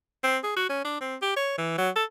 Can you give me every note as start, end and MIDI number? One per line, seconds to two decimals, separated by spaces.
0.24 0.38 60
0.43 0.55 68
0.56 0.65 66
0.69 0.82 61
0.85 0.98 62
1.01 1.16 60
1.22 1.32 67
1.36 1.53 73
1.58 1.77 52
1.78 1.89 54
1.96 2.04 69